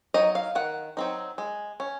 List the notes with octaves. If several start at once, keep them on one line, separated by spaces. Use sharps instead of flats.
F#3 C4 D#4 D#5
F5
D#3 F#5
F#3 C4 D#4
G#3
C#4